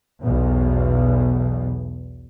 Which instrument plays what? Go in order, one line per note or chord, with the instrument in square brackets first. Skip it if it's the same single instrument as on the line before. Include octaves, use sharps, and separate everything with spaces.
[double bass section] B1 E2 B2